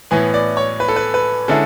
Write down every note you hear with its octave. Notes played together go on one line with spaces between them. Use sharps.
A2 E3 B3 G#5
D5
C#5
B4
A4
B4
B4
D3 G#3 C#4 E4 A4